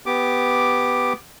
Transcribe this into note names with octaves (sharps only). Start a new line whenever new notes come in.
B3 G4 D6